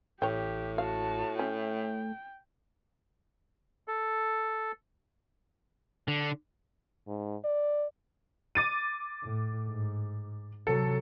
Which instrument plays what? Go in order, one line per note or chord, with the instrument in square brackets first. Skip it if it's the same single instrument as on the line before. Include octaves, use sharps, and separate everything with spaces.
[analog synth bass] A1 [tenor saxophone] A2 [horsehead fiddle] G4 [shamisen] C#5 G5
[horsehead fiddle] F#4 A5 [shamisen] F5
[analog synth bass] A3 [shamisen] C#4 [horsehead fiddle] G5
[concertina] A4
[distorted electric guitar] D3
[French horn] G#2
D5
[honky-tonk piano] D6 A6 D#7
[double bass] A2
G#2
[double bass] C3 F#3 [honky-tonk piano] A4